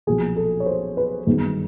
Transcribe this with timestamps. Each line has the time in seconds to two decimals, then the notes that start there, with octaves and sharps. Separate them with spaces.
0.07 B1 A#2 F3 G#4
0.36 A4
0.60 C#5
0.66 C5
0.97 B4
1.26 G1 F#2 D#3 G#3 B3